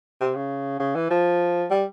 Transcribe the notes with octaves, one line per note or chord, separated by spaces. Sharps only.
C3
C#3
C#3
E3
F3
G3